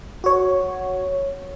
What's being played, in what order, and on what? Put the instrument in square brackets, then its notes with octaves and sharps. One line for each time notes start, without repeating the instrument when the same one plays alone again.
[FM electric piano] F#4 C#5